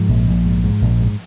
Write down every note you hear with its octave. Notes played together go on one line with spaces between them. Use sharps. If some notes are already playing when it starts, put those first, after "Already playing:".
Already playing: G#2 F3
A#1
A#1
G#2
G#2
A#1
G#2